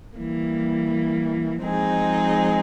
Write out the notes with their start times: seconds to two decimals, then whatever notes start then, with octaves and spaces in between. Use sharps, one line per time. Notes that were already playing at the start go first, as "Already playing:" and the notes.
0.17 E3 G3 A#3
1.62 F3 G#3 C4 D#4 G#4